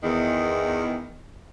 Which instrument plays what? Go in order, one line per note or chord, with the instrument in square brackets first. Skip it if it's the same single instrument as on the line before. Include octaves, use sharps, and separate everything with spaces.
[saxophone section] E2 D#3